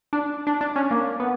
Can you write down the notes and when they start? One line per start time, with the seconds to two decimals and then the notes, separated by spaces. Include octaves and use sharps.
0.13 D4
0.47 D4
0.61 D4
0.76 C#4
0.91 A#3
1.20 B3